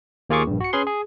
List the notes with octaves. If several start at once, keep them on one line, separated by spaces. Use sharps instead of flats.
D#2 A#3 F4 G#4 C#6 D6
A#1 G2
F#4 C#7
C#4 G#4 B4 C6
G#4